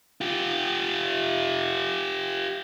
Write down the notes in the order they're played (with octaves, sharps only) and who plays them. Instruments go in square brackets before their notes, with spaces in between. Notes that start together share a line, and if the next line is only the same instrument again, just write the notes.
[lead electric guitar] F4 G4